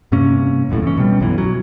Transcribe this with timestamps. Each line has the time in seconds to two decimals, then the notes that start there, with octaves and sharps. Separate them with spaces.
0.12 G2 C3 A#3 C#4
0.70 D#1 C#2 F#2 A2
0.82 E3 C#4
0.97 B2 G3
1.20 B1 F#2 B2 E3
1.38 F#3